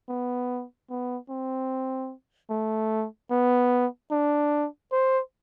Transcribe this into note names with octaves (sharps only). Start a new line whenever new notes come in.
B3
B3
C4
A3
B3
D4
C5